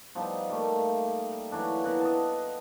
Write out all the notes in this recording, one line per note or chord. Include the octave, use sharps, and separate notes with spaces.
F3 G3 B3 D#4
G3 A3 A#3
E3 F#3 D4
E3 B3 F#5 A#5
D#5 A5